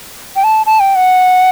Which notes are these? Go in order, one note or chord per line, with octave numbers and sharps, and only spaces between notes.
G5
A5
A5
G5
F#5